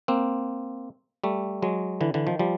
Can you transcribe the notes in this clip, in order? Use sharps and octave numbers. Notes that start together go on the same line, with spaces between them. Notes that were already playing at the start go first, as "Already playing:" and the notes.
A#3 C4
G3 A3
F#3 G#3
D3 E3
D3 E3
D#3 F3
F3 G3